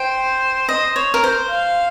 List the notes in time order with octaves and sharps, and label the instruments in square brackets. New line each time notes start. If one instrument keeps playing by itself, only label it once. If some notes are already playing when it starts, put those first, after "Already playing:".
Already playing: [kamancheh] C5 [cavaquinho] G5
[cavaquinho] D#5
C#5
A#4
C5
[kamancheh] F5